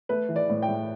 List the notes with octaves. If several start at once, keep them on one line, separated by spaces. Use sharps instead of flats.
A3 B4
E3
D5
A2
G5
A2